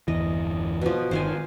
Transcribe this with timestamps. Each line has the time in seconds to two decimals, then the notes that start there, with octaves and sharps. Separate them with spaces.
0.08 G1 E2 E3 D#5
0.81 B2 F3
1.11 G1 D3 D#3 C5 F5 G#5